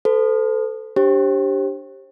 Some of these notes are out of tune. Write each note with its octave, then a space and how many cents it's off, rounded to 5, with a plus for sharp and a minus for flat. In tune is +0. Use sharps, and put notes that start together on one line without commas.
A4 +0 C5 -45
D4 -5 G4 +0 C5 +40